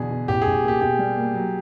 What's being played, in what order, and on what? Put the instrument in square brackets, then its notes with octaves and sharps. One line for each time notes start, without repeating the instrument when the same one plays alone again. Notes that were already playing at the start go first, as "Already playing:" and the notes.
Already playing: [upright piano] E2 B2 D3 [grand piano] G#4
[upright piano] B2
[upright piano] A1 [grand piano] G4
[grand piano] G#4
[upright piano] A1
[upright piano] A#3 [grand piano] G4
[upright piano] B2 [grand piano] G4
[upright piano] G3
A#3
F#3